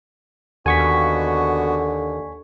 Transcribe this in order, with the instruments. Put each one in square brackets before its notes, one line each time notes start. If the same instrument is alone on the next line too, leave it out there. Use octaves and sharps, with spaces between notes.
[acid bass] D#2 [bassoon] D3 [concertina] B3 F#4 [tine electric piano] G#5 C#6 B6